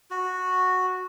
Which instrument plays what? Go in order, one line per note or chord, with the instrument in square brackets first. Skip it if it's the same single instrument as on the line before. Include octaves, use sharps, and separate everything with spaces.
[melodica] F#4